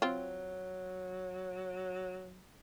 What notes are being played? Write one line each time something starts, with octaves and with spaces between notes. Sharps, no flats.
F#3 C4 F4